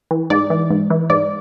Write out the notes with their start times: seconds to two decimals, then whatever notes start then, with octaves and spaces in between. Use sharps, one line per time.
0.11 E3
0.30 G#2 D5
0.50 E3
0.70 G#2
0.90 E3
1.10 G#2 D5